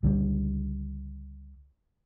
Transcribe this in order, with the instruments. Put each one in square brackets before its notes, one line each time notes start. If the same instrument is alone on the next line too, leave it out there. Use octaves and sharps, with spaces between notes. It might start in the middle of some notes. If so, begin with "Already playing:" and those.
[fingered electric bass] C#2 D3 E3 G3